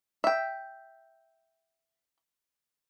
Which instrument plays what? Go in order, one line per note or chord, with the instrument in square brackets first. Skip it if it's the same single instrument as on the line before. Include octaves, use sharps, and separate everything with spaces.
[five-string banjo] E5 G5